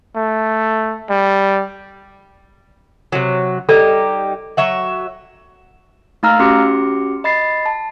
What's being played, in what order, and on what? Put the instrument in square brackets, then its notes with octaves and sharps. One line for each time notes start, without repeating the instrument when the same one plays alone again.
[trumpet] A3
G3
[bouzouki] C3 F#3
[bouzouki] G3 D#4 G4 [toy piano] A4 D5
[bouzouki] F#3 E5 F#5
[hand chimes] A3 D#4 F5 A#5 E6 F6
C#4 F#4 G4 C6 D6 C#7
D#5 B5 A6 C7
A5